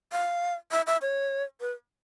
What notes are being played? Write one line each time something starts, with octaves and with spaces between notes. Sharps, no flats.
F5
E5
E5
C#5
B4